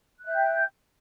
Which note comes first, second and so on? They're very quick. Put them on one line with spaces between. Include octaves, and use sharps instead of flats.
F#6 E5 G6 G5